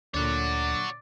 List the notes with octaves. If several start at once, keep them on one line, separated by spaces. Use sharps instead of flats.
D2 A#2 D3 C#5 D5 F#5